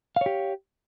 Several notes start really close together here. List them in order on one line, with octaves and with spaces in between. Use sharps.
F5 C#5 G4